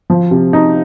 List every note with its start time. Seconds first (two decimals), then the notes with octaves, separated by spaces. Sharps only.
0.10 F3
0.31 C3
0.53 D#4